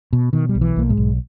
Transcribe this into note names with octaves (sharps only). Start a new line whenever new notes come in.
B2
B2 D#3
G3
B1
E3
B1 A#3
G#2 G#3
B1